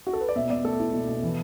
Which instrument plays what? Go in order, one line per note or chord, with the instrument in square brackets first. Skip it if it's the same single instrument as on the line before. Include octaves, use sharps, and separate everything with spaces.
[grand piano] F#4
A4
B4
D5
B2 E5
B2 D5
A3 A4
E4
B2
B2
E3